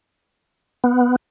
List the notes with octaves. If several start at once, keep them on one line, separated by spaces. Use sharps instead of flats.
B3